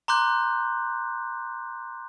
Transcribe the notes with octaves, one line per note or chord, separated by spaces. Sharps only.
A#5 C6 D6 F#6 G6